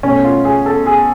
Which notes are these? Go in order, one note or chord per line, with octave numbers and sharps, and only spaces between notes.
B2 A3 C#4
F4
G#4
A4
G#4